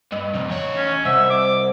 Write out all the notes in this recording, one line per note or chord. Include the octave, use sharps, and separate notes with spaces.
G2 D#5
C2 F2
E2 C#5
C#4
C2 C5 D#5 E5 F#5
D6